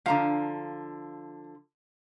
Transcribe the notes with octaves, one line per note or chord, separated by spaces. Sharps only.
D3 F3 F5 A#5